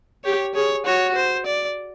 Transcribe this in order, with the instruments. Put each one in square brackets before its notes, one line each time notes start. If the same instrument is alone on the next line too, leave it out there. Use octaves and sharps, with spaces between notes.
[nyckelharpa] G4 [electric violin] C#5
[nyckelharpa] G#4 [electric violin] C#5
[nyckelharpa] F#4 [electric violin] C#5
[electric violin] C5
D5